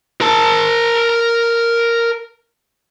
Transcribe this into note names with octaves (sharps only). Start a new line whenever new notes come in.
A#4 A5